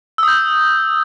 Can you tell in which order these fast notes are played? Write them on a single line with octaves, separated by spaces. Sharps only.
E6 D#6 G6